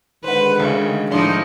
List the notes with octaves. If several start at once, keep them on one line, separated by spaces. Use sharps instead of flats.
D3 D#3 G#3 B4 C5 F#5
D2 C#3
A2 F3 D4 D#4 C6